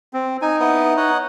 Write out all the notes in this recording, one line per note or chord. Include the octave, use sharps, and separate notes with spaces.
C4
D#4 G#5
B3 E4 D#5
C#5 D#5 F#5